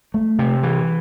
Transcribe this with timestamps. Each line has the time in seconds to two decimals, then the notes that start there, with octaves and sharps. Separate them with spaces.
0.14 A3
0.39 C3
0.63 E3